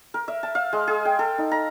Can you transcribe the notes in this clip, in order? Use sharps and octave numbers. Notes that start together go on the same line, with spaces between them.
A#4
E5
A5
F5
G#3
G#4
G5
A4
D#4
A#5